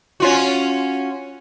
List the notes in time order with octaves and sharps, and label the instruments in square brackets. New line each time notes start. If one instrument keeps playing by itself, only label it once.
[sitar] C#4 F4 F#4